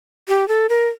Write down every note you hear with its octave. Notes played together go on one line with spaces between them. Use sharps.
G4
A4
A#4